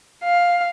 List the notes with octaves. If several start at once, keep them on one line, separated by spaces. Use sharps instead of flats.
F5